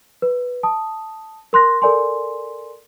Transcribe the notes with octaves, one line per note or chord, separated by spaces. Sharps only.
B4
A5 D#6
A#4 C6 F#6 A#6
A4 A#4 D5 G#5 C6